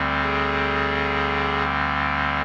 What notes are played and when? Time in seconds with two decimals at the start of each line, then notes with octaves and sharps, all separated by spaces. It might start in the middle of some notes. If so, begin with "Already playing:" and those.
Already playing: D2 D3 G3 C4
0.22 G#4